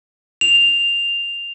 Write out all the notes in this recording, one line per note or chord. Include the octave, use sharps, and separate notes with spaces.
F7